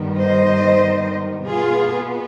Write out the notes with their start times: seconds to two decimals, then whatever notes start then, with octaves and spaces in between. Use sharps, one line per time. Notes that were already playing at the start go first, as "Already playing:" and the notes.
Already playing: G2 D#3 G3 B3
0.18 C5 D#5
1.46 B2 B3 F4 G#4